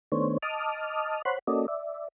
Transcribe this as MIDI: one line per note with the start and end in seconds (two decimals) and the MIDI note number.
0.12 0.38 51
0.12 0.38 57
0.12 0.38 59
0.12 0.38 62
0.12 0.38 72
0.12 0.38 73
0.43 1.22 75
0.43 1.22 81
0.43 1.22 86
0.43 1.22 87
0.43 1.22 89
1.25 1.39 72
1.25 1.39 73
1.25 1.39 78
1.25 1.39 83
1.25 1.39 84
1.25 1.39 90
1.47 1.66 58
1.47 1.66 61
1.47 1.66 66
1.47 1.66 69
1.47 1.66 74
1.47 1.66 75
1.68 2.08 74
1.68 2.08 76